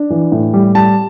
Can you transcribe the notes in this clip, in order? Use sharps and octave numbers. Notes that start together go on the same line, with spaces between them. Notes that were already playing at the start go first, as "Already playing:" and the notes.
Already playing: D4
E3
A2
G3
G3 A5